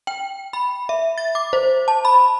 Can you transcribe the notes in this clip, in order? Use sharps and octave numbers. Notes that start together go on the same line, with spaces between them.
G5
B5
E5
A6
D6
C5
A5
B5